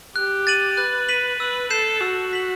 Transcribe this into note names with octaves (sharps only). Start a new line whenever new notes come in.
G4 F#6
A6 D#7 F#7
B4 F#6
B6 D#7 F#7
B4 E6
A4 G6 C7 E7
F#4 E6
B6 F#7